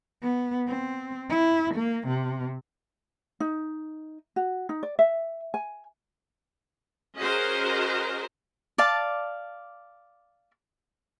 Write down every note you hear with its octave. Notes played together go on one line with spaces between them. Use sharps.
B3
C4
E4
A#3
C3
D#4
F#4
D#4
D5
E5
G#5
C#4 F#4 G#4 A#4 C5 D#5
D5 F5 A5